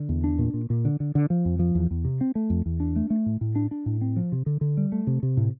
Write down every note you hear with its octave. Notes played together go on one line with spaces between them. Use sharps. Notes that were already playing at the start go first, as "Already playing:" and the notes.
Already playing: D3
E2
D4
A#2
A#2
A#2
D3
D3
D3
F3
F2
F3
E2
E2
C3
C4
A3
F2
E2
D4
A3
A3
A2
A2
D4
D4
A2
C4
F3
C3
D3
D3
G3
A3
C3
C3
A2